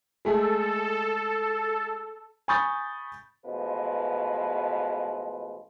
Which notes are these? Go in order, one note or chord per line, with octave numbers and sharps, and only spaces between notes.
G#3 A3 G#4 A4
G#5 B5 C#6 D#6 G6 A6
A1 B2 F3 G#3 B4